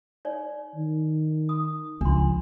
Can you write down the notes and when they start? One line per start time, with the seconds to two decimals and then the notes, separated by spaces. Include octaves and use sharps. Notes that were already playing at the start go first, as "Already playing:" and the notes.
0.25 D#4 C#5 D5
0.74 D#3
1.49 D#6
2.01 C#2 F3 D4 C6